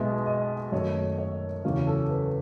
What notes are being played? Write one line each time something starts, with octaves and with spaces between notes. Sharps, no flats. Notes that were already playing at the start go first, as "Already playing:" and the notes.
Already playing: B1 B2 G#3 B3 E5
D#5
F#2 D#3 A3 C#5
C#5
E2 C#3 F#3 C#4
A4
B4